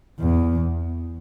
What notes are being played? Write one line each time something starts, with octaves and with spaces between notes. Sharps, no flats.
E2